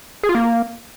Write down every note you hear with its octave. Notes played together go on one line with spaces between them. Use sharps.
G#4
F4
A#3